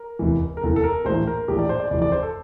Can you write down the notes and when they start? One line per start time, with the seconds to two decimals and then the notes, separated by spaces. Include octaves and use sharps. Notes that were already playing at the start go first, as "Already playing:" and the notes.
Already playing: A#4
0.19 F1 E2 E3
0.57 A#4
0.63 F1 E2 E3 A4
0.76 A4
0.84 A#4
1.05 A#1 A2 E3 C5
1.27 A#4
1.48 A#1 A2 E3 G4
1.59 D5
1.69 C5
1.80 D5
1.90 F1 F2 E3 D5
2.02 D5
2.12 C5
2.23 A4